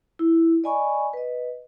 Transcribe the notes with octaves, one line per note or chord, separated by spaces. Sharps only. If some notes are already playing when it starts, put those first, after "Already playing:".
E4
D5 D#5 G#5 B5 C#6
B4 D#5